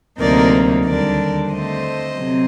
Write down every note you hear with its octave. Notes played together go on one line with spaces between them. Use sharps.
D2 C3 F#3 A#3 D#4 A#4 D5
D#2 D3 G3 D4 A#4 D5
D3 A3 C4 C5 D#5
C3 F#3 C4